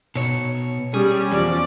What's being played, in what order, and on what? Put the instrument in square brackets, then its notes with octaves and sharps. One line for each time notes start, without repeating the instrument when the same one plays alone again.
[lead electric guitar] B2 C#5
[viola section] G3 [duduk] C#4 [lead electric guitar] G#4
[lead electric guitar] E2 [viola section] F3 D5